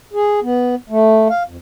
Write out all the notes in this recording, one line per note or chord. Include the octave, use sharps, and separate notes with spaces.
G#4
B3
A3
F5
F2